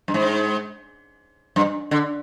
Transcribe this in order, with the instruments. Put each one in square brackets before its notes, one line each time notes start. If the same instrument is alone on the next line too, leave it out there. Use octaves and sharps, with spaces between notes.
[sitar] G2
G#2
G2
D3